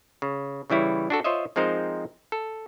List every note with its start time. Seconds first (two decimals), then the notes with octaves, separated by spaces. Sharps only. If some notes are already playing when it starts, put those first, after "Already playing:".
0.22 C#3
0.70 C#3 E3 G3 E4 C#5
1.10 D4 F#4 A4
1.24 F4 C5 C#5 D#5 E5
1.56 F3 G#3 C4 D#4 A#4 C5
2.32 A4